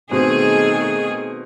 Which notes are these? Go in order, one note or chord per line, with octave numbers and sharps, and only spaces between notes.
B2 D#3 A3 C4 G#4